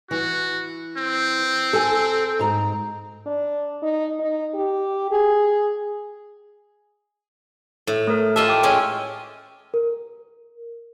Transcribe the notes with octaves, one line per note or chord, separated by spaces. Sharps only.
E3 F#4
C4
A4 G#5
G#2 A#5
D4
D#4
D#4
G4
G#4
A2
A3 A#4
F4 G4 D#5 E5 A5 E6
G5 D6 F6
G#3 C#4 C#5 G5
A#4